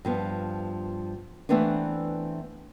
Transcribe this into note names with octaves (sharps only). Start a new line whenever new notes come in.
G2 F3 B3
E3 A3 B3 C4 D4